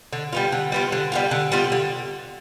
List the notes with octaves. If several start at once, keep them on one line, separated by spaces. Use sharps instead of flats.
D3
G3 B3 F4
D3
G3 B3 F4
D3
G3 B3 F4
D3
G3 B3 F4
D3